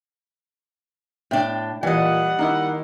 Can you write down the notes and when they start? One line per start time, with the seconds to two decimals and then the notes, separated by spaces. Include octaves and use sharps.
1.31 A2 D4 G5
1.83 A#2 E3 G3 D#5 F#5
2.39 D#3 A#3 D#4 E4